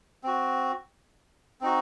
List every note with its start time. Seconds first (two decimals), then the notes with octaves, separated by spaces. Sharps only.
0.23 C4 F#4
1.61 C4 D#4 F#4